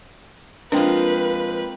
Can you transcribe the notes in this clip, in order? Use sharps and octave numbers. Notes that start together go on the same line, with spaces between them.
F3 G#3 A#3 C4 D4 B4 G5